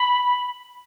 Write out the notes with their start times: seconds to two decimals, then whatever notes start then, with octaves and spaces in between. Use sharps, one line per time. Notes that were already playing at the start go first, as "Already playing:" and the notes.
Already playing: B5